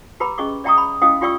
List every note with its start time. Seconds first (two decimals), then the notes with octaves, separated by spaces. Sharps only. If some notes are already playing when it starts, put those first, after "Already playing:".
0.20 G4 B4 A#5 B5 D6
0.38 C#4 G#4 D#5 C#6 D6
0.64 D5 E5 G5 A#5 C#6 D#6
0.78 B5
1.02 C#4 E4 D#5 F5 G5 D#6
1.21 F4 G4 D5 G5 C#6 E6